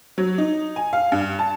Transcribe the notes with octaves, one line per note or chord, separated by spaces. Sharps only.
F#3
D#4
G#5
F5
G2
A5